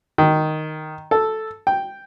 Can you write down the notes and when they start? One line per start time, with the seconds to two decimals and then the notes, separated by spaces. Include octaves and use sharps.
0.18 D#3
1.11 A4
1.67 G5